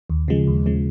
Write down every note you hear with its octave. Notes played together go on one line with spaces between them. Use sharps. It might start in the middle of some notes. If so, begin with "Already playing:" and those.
D#2
C#3 F3 G#3
D#2
C#3 F3 G#3